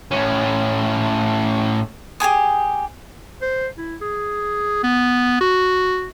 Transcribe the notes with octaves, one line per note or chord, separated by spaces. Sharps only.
A2 C#4
G4 G#4 G#5 D#6
C5
E4
G#4
B3
F#4